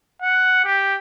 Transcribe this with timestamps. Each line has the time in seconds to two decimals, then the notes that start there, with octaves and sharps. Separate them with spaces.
0.22 F#5
0.64 G4